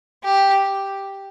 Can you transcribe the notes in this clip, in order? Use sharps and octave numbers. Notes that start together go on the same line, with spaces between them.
G4